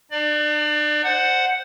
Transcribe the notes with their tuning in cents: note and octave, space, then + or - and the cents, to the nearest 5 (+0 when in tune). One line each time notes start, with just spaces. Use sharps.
D4 +45 D5 +25
C5 +0 F#5 +0